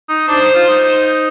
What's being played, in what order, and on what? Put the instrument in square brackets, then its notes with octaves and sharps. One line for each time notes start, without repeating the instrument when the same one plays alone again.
[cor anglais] D#4
[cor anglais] D4 [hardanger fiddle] C5
[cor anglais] D#4
F4
D#4